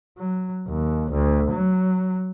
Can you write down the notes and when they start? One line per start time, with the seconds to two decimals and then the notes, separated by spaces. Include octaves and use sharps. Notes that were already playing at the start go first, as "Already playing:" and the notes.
0.18 F#3
0.68 D#2
1.11 D2
1.51 F#3